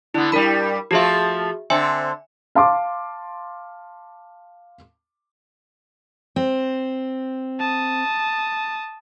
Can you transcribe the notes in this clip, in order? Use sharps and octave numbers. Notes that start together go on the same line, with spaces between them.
D3 B3 E4
G2 G3 A#4 B5
F3 A3 F4 F#4 G#4 E5
D3 C4 E5 G#5 C#7
F5 A5 C6 D6
C4
A5 D#6